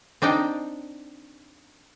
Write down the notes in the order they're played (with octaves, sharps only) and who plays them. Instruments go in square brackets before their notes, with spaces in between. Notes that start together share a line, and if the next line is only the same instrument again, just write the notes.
[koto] C4 D4 D#4 G5